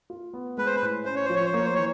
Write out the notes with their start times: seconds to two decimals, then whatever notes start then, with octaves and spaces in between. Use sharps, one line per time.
0.10 F4
0.33 B3
0.57 G#3 B4
0.66 C5
0.76 B4
0.82 A2
1.05 C#4 C5
1.16 C#5
1.25 F3 C5
1.36 C#5
1.45 C5
1.53 A#3 C#5
1.64 C5
1.75 E3 C#5